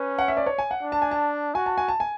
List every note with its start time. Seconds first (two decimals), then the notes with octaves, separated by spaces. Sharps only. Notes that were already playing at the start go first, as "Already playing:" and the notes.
Already playing: C#4 B4
0.19 F#5
0.28 E5
0.37 D5
0.46 C#5
0.58 G#5
0.71 F#5
0.82 D4
0.92 A5
1.02 G#5
1.11 A5
1.55 F#4 G#5
1.66 A5
1.78 G#5
1.88 A5
2.00 G#5